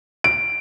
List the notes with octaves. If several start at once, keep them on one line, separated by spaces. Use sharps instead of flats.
D7